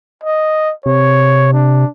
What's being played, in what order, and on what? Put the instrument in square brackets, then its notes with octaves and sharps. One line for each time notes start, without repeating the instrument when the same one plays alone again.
[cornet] D#5
[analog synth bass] C3 [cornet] C#5
[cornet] D4